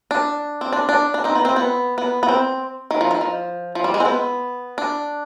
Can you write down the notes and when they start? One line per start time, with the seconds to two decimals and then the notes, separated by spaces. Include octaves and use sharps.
0.11 D4
0.61 C4
0.73 D4
0.89 D4
1.14 D4
1.24 C4 D#4
1.35 B3
1.45 C4
1.56 B3
1.98 B3
2.23 B3
2.29 C4
2.91 D#3
3.01 F3
3.11 D#3
3.21 F3
3.75 F3
3.84 G3
3.94 G#3
4.00 C4
4.05 B3
4.78 D4